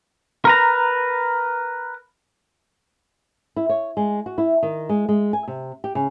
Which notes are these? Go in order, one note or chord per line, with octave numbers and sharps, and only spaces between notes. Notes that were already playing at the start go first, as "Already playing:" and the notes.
A#4 B4 A#5
E4
C#5
G#3
F#4
E4
D#3
G#3
G#3
G#5
C3
G4
C#3